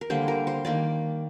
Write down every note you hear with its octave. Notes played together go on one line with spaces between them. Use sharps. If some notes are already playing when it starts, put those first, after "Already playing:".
A#4
D3 G3 A#3 C5
A#4
C5
D#3 A#3 D5